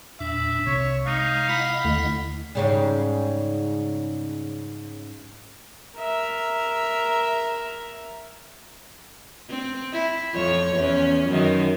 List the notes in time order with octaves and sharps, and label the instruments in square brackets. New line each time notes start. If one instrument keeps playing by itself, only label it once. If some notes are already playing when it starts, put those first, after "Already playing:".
[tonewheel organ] E2 A#2 D4 [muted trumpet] E5
[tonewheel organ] C2 [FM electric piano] C3 [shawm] C#5
[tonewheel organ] G#3 [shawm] D#4 [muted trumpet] F5
[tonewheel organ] E4 D#5 F#5 [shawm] B5
[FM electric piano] D#2 D3 A3
[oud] G#2 C#3 G3
[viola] A#4 E5
[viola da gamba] C4
E4
F2 F4 C#5
E2 C#4
F#2 D#3